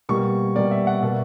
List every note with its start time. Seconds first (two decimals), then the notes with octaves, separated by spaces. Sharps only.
0.09 B2 G3 A#3 C#6
0.55 B2 G3 A#3 D5
0.71 E5
0.87 F#5
1.03 B2 A#3 E5